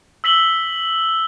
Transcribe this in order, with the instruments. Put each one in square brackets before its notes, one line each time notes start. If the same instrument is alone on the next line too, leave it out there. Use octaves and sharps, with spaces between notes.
[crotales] E6 B6 F#7 G7